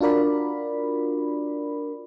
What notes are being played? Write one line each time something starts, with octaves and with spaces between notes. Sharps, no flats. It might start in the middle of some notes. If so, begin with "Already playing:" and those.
D4 F4 F#4 A#4 D5 B5